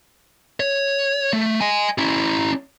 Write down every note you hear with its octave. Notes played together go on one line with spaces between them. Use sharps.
C#5
A3
D#5 G#5
C#4 E4